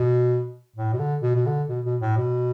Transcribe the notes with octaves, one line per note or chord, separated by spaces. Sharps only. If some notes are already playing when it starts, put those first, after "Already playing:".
Already playing: B2
A2
B2
D3
B2
B2
D3
B2
B2
A2
B2